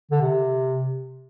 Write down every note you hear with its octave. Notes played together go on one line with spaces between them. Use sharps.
D3
C3